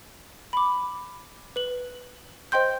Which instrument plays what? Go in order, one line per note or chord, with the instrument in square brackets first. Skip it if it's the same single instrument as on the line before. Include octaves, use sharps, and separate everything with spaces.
[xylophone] B5 D6
B4 F#7
C5 D#5 G5 C6 G6